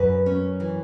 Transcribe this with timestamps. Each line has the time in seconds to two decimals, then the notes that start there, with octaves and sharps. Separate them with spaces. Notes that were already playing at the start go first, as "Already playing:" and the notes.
Already playing: F#2 B4
0.26 C#4
0.60 E3